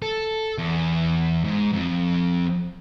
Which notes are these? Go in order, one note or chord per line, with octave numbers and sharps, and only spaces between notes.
A4
E2
G#2
F2